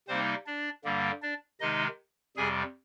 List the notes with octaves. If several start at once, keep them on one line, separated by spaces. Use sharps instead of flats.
C3 G3 A#3 C4 D#4 C5
D4 D5
G2 D3 G3 A#3
D4 D5
C3 D#3 G#3 D#4 D#5
F2 C3 G3 G#4 G#5